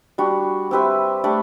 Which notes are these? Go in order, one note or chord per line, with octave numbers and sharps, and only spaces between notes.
G3 D4 F#4
C4 G4 B4 E5
A3 D4 G4 D5